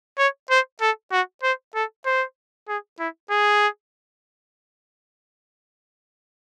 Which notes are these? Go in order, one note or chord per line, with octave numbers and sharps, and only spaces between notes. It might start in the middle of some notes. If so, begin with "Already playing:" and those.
C#5
C5
A4
F#4
C5
A4
C5
G#4
E4
G#4